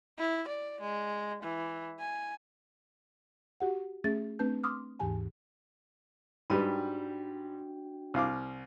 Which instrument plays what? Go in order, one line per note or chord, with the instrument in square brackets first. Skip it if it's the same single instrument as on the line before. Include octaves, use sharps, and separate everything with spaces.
[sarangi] E4
D5
G#3
E3
G#5
[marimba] F#4 G4 F#5
A3 C#4 G#4 E5 A6
A3 C4 D4 B4 A5 G6
C6 D6 D#6 F6
D#2 G#2 E3 G4 G#5 A5
[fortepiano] G#2 G3 B4 [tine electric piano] D4 F#4 G5
[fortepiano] C2 F5 D6